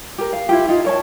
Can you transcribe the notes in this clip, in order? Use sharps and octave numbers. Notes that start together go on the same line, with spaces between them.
G4 A#4
F5
E4 F4 G4
D#4 F4
A#4 C#5 A5